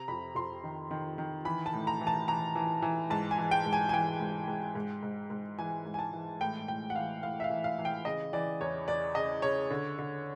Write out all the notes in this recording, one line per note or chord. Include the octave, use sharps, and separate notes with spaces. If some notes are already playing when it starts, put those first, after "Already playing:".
Already playing: C3 A#5
F2 B5
F2 C6
D#3
D#3
D#3
E3 B5
A5
A2
A#5
E3
A5
E3 A#5
E3
E3
G#2 A5
G#5
E3
G5
G#2
G#5
G#5
E3 G5
G#2
G#2
G#2
G#2
G#2
E3 G#5
G#2
G#5
A5
E3
A2 G5
A2 G5
F#5
E3 F5
A2 F5
E5
F5
E3
F5
E3
G5
C#3 D#5
E3 D5
E2 C#5
E2 D5
C#3 D#5
C#3 C#5
D3
D3